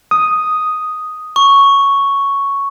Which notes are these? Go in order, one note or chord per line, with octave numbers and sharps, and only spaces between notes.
D#6
C#6